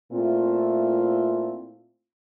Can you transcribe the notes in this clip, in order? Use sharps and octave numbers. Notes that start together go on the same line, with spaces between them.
A#2 A3 C4 E4 F4